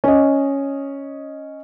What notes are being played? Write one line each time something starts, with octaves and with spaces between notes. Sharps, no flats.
C#4 D#5